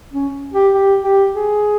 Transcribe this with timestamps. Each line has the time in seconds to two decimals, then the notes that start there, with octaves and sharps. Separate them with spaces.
0.13 C#4
0.54 G4
0.74 G4
1.04 G4
1.35 G#4